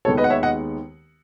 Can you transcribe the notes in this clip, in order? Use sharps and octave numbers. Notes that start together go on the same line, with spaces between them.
D#2 D#3 G#3 B3 A4 C#5
B4 D#5
F#5
C#5 E5
D#5 F#5